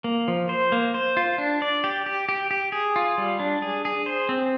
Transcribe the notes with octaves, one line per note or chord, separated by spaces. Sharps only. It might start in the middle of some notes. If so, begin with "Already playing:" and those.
A#3
F3
C5
A#3
C5
F4
D4
D5
G4
G4
G4
G4
G#4
F4
G3
D4
G#4
G#4
C5
C4